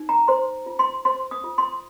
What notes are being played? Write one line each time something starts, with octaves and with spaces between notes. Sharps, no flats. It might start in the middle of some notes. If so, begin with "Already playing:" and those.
Already playing: D#4
A#5
C5 C6
F4
C6
C5 C6
D#6
F4
C6